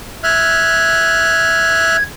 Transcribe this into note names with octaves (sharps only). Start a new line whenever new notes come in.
E5 F6 F#6 G#6